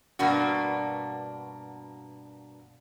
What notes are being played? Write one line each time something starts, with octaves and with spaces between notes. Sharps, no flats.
G2 B2 A#3 D4 F#4